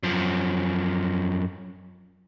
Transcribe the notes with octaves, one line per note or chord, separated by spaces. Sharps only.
F#2 F3